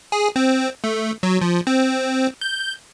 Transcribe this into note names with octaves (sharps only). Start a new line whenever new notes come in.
G#4
C4
A3
F#3
F3
C4
G6